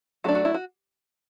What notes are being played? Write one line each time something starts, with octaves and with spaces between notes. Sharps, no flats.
F#3 A3 D4 F#4
F#4
E4
F#4